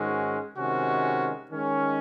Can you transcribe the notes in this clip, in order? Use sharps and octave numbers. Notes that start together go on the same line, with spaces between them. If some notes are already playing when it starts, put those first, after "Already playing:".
Already playing: G#2 D#3 G#3 C#4 F#4
C3 D#3 G#3 C#4 F#4
D#3 G#3 C#4